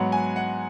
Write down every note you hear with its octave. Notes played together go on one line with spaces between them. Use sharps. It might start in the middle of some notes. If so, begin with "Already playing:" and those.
Already playing: G#2 F#3 B3 F#5
G#5
F#5